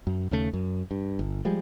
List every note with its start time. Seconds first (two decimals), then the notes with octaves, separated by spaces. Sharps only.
0.07 F#2
0.31 D#2 C#3 A3
0.53 F#2
0.91 G2
1.19 G1
1.45 F3 G3 G#3